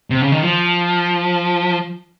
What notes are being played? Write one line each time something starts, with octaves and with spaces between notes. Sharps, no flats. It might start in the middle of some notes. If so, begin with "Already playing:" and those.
C3
C#3
D#3
F3